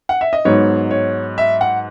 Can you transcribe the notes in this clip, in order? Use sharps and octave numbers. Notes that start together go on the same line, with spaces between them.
F#5
E5
D#5
G#2 F#3 B3 D#4 C#5
C#5
E5
F#5